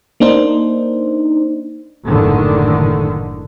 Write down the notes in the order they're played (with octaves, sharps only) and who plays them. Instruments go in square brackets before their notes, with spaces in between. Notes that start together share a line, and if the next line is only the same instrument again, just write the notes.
[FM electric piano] A#3 D4 D#4 C5
[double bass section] F#1 A2 D3 D#3